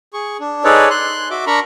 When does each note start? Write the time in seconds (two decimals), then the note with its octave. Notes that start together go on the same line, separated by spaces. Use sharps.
0.14 G#4 C#6
0.40 D4
0.64 D#4 G#4 A4 B4 C#5 D5
0.90 C6 F#6
1.31 F#4 E5 D6
1.47 D4 A#4 A#5 B5 C#6